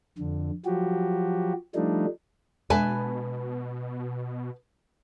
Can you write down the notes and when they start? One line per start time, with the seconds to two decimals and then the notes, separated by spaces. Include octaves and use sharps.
0.18 F2 D3
0.65 F3 F#3 F#4 G4
1.75 F3 G3 A3 D4 D#4
2.70 B2 G#3 D4 B4 G#5 A5